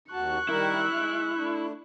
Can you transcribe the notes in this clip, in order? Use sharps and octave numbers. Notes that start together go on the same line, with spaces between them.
D#2 F#4 A5 C#6 F#6
D#3 G3 E4 A#4
G#3
A3 D4